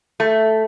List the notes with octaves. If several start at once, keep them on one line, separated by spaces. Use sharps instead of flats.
A3